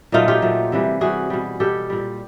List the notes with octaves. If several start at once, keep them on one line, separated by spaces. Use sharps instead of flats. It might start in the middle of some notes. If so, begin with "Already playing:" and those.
A#2 F#3 A3 D#4 F4
F4 G4
A#2 F#3 A3
C3 E3 G3
C3 E3 G3 F#4 G#4
B2 G3
B2 G3 G4 A4
A#2 G3